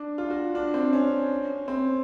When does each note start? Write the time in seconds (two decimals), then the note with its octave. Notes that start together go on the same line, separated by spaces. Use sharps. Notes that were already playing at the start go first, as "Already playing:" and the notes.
Already playing: D4
0.18 F4
0.30 F#4
0.55 D4
0.74 C4
0.93 C#4
1.68 C4